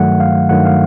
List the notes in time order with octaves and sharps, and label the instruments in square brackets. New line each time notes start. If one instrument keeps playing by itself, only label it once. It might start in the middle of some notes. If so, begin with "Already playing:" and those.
Already playing: [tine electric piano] G2 D#3 F#3 A3 F#5
F5
G2 D#3 F#3 A3 F#5
F5